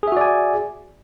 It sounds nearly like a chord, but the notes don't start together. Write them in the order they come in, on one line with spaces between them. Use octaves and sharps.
G#4 E5 F#4 D5 G#5